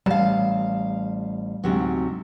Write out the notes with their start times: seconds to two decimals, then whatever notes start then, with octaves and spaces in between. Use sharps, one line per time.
0.06 A1 G3 F5 A5
1.64 D2 G#2 C3 F#3